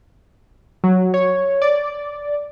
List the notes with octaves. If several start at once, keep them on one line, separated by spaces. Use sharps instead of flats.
F#3
C#5
D5